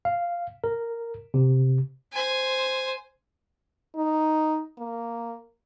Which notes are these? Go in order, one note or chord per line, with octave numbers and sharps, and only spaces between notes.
F5
A#4
C3
C5 G#5
D#4
A#3